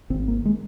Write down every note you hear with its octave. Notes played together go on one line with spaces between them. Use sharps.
G#1 C4
A#3
G#3